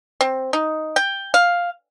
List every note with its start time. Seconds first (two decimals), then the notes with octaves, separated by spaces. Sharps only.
0.21 C4
0.53 D#4
0.96 G5
1.34 F5